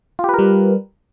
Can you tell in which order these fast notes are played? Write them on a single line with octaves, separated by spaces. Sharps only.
F4 G4 B4 A#4 G3